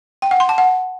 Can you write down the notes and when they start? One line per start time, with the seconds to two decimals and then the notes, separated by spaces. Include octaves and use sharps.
0.22 G5
0.31 F#5
0.40 C6
0.49 A5
0.58 F#5